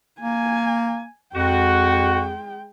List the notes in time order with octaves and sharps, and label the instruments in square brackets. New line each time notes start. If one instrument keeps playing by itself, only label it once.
[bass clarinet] A#3 [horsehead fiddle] G#5
[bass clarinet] F2 [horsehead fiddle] G#3 G5 [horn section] F#4